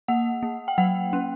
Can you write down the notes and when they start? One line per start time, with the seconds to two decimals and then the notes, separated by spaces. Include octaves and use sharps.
0.08 A#3 F#5
0.43 A#3
0.68 G5
0.78 F#3 F#5
1.13 C#4